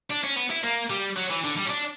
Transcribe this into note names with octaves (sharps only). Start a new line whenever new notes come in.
D4
C#4
B3
E4
A#3
G3
F#3
E3
D3
G3
C#4
D4